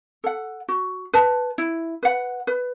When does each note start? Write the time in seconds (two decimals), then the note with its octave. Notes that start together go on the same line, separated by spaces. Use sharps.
0.24 A4 F#5
0.68 F#4
1.13 B4 A5
1.58 E4
2.03 B4 F#5
2.47 B4